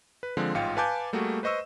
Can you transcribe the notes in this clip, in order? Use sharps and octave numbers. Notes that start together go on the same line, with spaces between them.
B4
D3 F3 G#3 C4
A1 G#2 F4 F5 G5 C#7
B4 F5 G#5 A5 D6 G6
G3 A3 A#3 F#4 G#4
B4 C5 D#5 C#6 E6